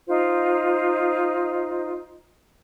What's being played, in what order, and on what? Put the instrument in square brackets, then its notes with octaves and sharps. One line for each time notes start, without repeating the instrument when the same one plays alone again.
[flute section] D#4 F4 C5 D#5